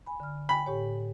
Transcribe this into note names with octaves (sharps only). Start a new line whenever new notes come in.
G#5 B5
D3 F6
G5 G#5 B5
A2 G4 C#5